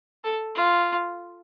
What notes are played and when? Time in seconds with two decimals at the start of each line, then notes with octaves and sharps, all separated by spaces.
0.24 A4
0.55 F4